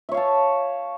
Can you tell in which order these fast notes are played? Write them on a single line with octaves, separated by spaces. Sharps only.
E5 C#5 F5 A5